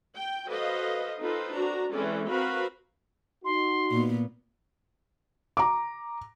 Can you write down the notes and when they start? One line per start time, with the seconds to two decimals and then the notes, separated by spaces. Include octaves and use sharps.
0.15 G5
0.48 F#4 A4 B4 C5 D#5 F5
1.21 C4 D#4 F4 A4 B4
1.54 D4 F#4 A#5
1.92 E3 G#3 C4 C#4 A4 D5
2.28 C4 F#4 A#4 B4 F5 B5
3.45 D#4 F#4 C6
3.91 A#2 B3
5.57 A#5 D6